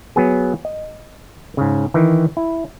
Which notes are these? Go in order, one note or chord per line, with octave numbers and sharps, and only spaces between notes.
F#3 B3 G#4
D#5
G#2 C#3
D#3 E3
E4